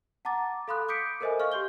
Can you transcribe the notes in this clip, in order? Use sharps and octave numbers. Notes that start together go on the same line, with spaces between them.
F#5 A5 A#5 D6 A6
A4 F5 B5 C6 D#6 F#6
D6 D#6 G6 B6 C#7 D7
A4 A#4 C5 D#5 E5 G#5
D#5 F5 C#6 F6
G4 C6 G6 G7